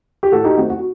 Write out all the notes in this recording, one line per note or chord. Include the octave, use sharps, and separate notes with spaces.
G4
A2 F#4 A4
D#4 G4
A3 C4 F#4
F#4